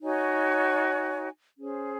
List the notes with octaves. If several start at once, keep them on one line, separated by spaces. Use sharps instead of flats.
D#4 F#4 C#5 G#5
C#4 G#4 C5